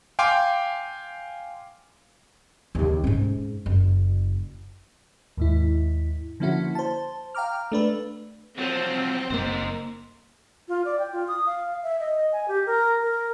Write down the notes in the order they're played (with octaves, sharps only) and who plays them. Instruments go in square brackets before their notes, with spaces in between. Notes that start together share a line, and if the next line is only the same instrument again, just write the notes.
[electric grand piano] F5 G5 G#5 C6 D6
[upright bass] D#2 C#3
G#2 C#4
F#1
[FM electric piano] D#2 G#2 E4
D3 F3 A#3 C#4 E4 F#4
C5 A5
F5 G5 A#5 D6 F6
A3 D4 B4
[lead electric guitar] F3 F#3 [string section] C4
[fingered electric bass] F#1 B2 A#3 [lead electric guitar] D#4 C5
[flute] F4
D5
G5
F4
D#6
F5
E5
D#5
G#5
G4
A#4
A#4